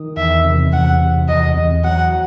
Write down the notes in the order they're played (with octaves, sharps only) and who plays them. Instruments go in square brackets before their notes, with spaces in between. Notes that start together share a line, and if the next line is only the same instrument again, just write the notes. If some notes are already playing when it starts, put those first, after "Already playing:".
Already playing: [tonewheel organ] D#3
[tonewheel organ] E2 [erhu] E5
[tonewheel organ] C3
[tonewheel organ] E2 [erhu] F#5
[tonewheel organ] C3
[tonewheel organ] E2 [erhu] D#5
[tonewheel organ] E2
[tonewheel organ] F#3 [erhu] F#5